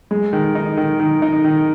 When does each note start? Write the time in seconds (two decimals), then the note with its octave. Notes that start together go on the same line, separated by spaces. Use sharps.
0.11 G#3
0.33 D#3
0.55 D#4
0.77 D#3
1.00 D#3
1.22 D#4
1.45 D#3